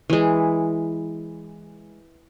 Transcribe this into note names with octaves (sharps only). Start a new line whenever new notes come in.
E3 G#3